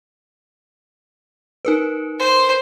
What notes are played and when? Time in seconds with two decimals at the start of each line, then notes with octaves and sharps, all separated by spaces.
1.65 D#4 A#4 B4
2.19 C5